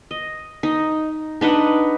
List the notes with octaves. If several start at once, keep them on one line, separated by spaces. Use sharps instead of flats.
D#5
D#4
D4 D#4 B4 F#5